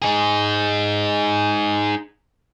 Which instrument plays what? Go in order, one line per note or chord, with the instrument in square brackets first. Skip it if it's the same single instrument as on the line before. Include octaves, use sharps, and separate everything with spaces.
[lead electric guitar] D#4 G#4